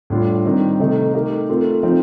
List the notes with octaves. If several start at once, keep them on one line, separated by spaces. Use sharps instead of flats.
A2 G3 D4 F4
D#3 G3 C4
C3 D#3 A3 D#4
A3 D#4 G4 A#4
A3 C4 F4 A#4
F3 C4 D#4